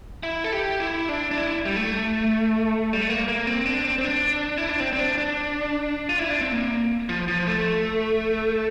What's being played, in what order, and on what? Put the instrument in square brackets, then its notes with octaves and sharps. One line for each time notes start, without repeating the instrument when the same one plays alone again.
[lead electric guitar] E4
A4
G4
E4
D4
D4
E4
G3
A3
G3
A3
A#3
A#3
C4
D4
C4
C4
D4
E4
D4
C4
C4
D4
D4
F4
E4
D4
C4
A#3
F3
F3
A3